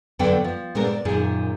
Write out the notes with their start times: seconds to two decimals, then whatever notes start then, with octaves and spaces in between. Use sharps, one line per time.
0.19 F2 D3 F#3 B3 D5 G5
0.44 F3
0.75 A#2 G#3 B3 C4 D4 A#4
0.87 D5
1.05 F#2 A#2 D#3 A#3 G#4